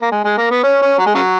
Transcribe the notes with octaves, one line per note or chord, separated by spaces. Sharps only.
A#3
G#3
G#3
A#3
B3
C#4
C#4
F#3
G#3
C#3 F#3